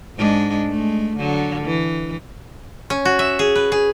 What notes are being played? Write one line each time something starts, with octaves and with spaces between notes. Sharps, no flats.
G#2 G#3 D4
G#3 A3
D3 F#3
E3
C#4
F#4
E5
G#4
B4
G#4